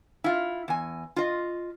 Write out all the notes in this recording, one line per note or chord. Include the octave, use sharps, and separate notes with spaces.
E4 F4
E2 G#5
F4 D#5